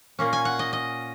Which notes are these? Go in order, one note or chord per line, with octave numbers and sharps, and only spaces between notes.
A#2 A#3 C#4
G#5
F#5
D#5
D#5